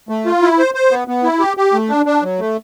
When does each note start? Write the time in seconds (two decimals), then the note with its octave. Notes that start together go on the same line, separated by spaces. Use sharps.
0.09 A3
0.26 F4
0.42 E4
0.58 C5
0.74 C5
0.91 B3
1.08 B3
1.23 E4
1.40 G4
1.57 G4
1.73 A3
1.89 D4
2.06 D4
2.22 F#3
2.39 A3